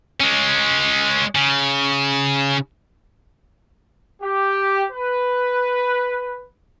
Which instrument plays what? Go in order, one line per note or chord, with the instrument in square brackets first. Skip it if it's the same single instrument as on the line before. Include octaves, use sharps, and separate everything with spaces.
[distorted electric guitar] G#3 C#4
C#3
[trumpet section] G4
B4